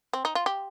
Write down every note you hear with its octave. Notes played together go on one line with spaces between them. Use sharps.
C4
D#4
F4
G4